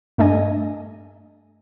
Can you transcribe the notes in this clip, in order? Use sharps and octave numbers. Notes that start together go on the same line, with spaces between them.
G2 A3 D4 D#5 G#5